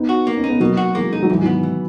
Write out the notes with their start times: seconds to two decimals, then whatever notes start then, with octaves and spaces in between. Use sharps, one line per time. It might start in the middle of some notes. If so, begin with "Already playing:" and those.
Already playing: B3 D#4
0.09 F#4
0.27 A#3
0.37 C#4
0.44 D#4
0.49 B3
0.60 B2 F#3 A#3
0.77 F#4
0.95 E3 G#3 A#3
1.12 G#3 D#4
1.23 F#3
1.30 G#2 E3
1.42 D#3 F#3 B3
1.63 E3